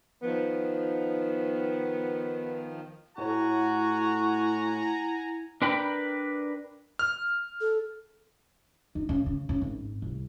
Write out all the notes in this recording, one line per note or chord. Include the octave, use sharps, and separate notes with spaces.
D#3 F3 B3
A2 E4 F#4 F#5 G#5 A#5
D4 A#4 B4 G5 B5
F6
A4
D#4
C#3
C#3
C#3
G#1
C2